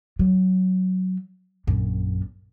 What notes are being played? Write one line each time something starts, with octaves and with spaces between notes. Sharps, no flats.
F#3
A#1 F#2